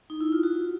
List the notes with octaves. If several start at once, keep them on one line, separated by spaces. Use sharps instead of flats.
D#4
E4
F4
F#4